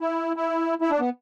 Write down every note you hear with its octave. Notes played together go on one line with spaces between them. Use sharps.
E4
E4
E4
D4
B3